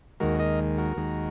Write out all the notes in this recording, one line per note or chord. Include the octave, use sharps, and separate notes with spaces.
D#2 D#3 G#3 F#4 A#4
A#4 D#5
F#4 A#4
D#2 D#3 G#3